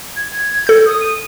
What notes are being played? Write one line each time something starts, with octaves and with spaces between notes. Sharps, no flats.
G#6
A4 G6
D#6
D#7